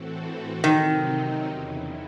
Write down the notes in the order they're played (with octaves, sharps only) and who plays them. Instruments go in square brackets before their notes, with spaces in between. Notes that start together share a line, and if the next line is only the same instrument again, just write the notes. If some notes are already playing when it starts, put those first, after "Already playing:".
Already playing: [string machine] A2 E3 C4 F#4 A4
[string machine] C3 F#3 C4 D#4 [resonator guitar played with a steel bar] D#3
[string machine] E2 C#3 E3